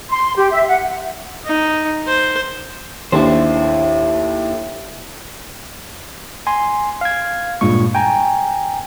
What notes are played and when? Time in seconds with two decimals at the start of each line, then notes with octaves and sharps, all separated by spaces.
0.10 C6
0.37 G4
0.50 E5
0.67 F#5
1.45 D#4
2.08 C5
3.12 D#2 D4 E4 A4 C5
6.47 G#5 C6
7.01 F5 G#6
7.61 G2 A#2 G#3 C#6
7.95 G5 G#5 A#5